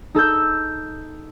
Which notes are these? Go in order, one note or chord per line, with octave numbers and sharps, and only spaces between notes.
D#4 A4 E6 G6